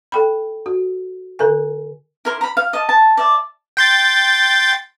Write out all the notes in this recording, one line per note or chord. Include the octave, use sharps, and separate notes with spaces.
A4 G5 B5
F#4
D3 A4 A#4 G#5
E4 A#4 C6
A#5 B5
F5
D#5 A5
A5
D5 E5
G5 C6 A6